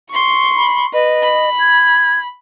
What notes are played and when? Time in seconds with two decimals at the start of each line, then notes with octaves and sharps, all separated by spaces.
0.11 C6 C#6
0.57 B5
0.93 B4 D#5
1.23 B5
1.59 G#6